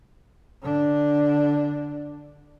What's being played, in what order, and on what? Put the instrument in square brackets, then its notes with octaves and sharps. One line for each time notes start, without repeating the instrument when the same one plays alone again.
[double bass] D3 D4